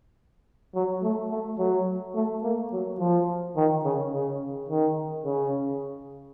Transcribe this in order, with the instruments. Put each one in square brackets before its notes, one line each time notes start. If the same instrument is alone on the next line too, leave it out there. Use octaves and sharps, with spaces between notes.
[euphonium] F#3
A3
A3
F#3
A3
A#3
F#3
F3
D#3
C#3
C#3
D#3
C#3